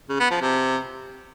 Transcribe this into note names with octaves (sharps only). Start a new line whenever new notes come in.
C#3
B3
F3
C3